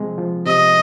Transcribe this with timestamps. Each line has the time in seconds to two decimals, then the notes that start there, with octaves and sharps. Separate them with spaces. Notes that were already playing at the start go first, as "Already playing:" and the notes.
Already playing: C3 F3 G#3 C4
0.18 F3
0.46 C3 D#5